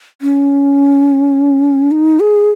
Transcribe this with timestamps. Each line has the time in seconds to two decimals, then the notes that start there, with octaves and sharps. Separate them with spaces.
0.22 C#4
1.91 D#4
2.20 G#4